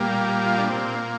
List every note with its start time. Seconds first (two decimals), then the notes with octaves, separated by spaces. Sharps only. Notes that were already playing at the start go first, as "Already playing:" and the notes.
Already playing: A#2 G3 A#3
0.46 F4
0.58 D4
0.69 A#2 A#3 C4